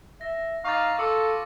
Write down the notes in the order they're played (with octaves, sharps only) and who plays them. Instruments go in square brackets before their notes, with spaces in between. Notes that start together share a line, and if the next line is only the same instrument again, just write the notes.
[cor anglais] E5 [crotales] A#6
[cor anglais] D#4 [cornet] F5 [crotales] C#6 D6 A6
[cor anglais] F4 [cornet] A4 [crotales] D6 E6 C#7